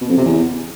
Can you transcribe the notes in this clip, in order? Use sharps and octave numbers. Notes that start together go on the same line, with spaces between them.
B2
F2
C3
E2